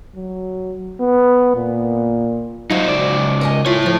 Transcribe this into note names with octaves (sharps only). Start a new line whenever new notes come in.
F#3
B3
A#2
F#3 D#4 F4 F#4 C5
C#2 D5
A#4 D#5 G#5
E4 F4 C#5
A2 F3